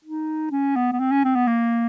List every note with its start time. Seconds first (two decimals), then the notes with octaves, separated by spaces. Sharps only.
0.04 D#4
0.51 C#4
0.76 B3
0.92 B3
1.00 C4
1.11 C#4
1.24 C4
1.35 B3
1.47 A#3